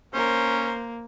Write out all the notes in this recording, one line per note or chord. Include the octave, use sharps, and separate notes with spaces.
A#3 C#4 A#4 C5